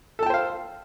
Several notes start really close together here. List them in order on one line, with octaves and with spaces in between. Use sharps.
A4 A5 G5 C5 F5